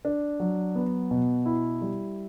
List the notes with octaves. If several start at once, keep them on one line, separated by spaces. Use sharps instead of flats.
D4
F#3
B3
B2
E4
G3